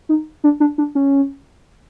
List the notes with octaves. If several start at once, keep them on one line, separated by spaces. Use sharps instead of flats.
D#4
D4
D4
D4
C#4